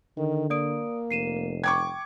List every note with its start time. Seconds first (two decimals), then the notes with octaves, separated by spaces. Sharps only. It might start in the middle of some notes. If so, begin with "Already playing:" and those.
0.17 D3 D#3
0.50 A#3 D5 D#6 D7
1.11 F1 C7 D#7 E7
1.64 G5 C#6 D6 G#6